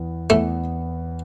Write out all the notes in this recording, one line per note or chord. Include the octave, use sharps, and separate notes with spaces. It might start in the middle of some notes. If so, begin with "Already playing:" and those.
Already playing: E2 E3 B3
E2 E3 A3 B3